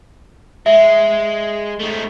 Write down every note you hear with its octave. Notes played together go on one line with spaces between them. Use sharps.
G#3 E5
A3 D#4